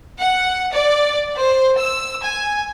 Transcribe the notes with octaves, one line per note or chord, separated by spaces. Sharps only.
F#5
D5
C5
E6
G#5